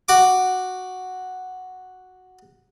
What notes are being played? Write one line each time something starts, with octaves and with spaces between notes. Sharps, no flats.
F#4 D6